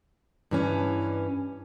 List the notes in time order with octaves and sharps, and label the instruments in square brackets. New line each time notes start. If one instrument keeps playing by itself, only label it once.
[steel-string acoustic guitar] G2 E3 C#4